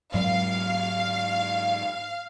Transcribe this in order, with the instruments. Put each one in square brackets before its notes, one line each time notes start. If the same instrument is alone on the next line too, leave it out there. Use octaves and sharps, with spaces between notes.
[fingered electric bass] G#2 F#3 G#3 [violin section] F5